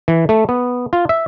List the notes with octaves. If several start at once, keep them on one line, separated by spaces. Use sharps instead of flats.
E3
A3
B3
F4
E5